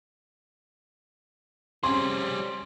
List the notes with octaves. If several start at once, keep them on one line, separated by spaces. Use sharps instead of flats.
G3 C4 C#4 G#4 C6